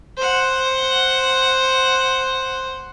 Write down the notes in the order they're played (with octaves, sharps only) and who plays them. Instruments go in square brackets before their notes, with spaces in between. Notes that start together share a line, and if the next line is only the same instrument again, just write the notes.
[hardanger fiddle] C5 F#5